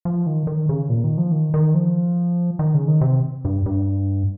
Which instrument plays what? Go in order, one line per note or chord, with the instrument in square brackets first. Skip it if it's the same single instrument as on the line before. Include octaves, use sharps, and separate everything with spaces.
[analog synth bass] F3
D#3
D#3
C#3
A#2
D#3
F3
D#3
D#3
F3
D#3
C#3
D#3
C3
G2
G2